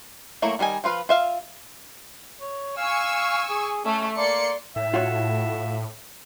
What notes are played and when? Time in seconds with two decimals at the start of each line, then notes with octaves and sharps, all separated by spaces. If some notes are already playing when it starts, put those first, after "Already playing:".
0.42 F#3 A3 A#3 E4
0.59 D#3 G3 D#5 G#5
0.84 F3 F4 B4 F5
1.09 F4 E5 F5
2.41 C#5
2.77 F5 G#5 C#6 E6
3.50 G#4
3.85 A3 C#4
4.17 A#3 D5 C6 C#7
4.76 A2 E5
4.94 F4 F#4 C#5